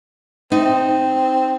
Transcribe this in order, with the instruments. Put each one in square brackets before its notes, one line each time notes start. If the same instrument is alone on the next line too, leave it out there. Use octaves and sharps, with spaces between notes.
[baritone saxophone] C4 [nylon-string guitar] D#4